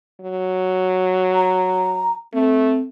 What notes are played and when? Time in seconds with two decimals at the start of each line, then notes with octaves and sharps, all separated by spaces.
0.20 F#3
1.35 A#5
2.33 A3 C4